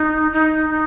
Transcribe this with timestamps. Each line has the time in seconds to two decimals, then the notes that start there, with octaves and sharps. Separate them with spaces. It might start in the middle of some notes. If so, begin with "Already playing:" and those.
Already playing: D#4
0.32 D#4
0.70 D#4